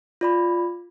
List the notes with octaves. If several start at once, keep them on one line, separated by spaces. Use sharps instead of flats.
F4 D5 B5